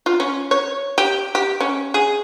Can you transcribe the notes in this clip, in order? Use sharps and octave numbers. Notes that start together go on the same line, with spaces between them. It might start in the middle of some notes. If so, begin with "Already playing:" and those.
F4
C#4
C#5
G4
G4
C#4
G#4